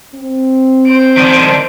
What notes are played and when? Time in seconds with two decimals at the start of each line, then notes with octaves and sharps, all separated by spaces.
0.15 C4
0.86 C5 D7
1.17 D#3 D4